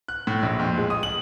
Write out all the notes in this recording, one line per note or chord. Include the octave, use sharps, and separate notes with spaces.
F#6
A2
A#1
F2
G#3
D#6
F#7